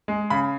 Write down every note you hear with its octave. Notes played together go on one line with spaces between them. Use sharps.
G#3
C#3 B5